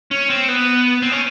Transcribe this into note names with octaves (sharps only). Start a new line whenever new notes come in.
C#4
C4
B3
C4
C#4